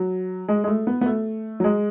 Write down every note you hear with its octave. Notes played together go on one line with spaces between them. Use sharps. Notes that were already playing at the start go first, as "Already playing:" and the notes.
Already playing: F#3
G#3
G#3
A3
B3
B3
A3
F#3
G#3